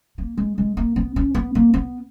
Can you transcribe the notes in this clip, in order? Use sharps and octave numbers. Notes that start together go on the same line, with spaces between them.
A#3
G#3
G#3
A#3
B3
C#4
B3
A#3
B3